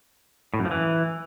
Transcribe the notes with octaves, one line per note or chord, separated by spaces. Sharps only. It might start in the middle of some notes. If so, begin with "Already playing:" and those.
A2
F#2
F3
E3